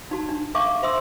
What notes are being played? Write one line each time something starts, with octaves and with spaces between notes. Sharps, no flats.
D#4 F#4 A5
D4
A4 E5 F5 G#5 C#6 D6
G#4 C5 E5 C6 D#6 E6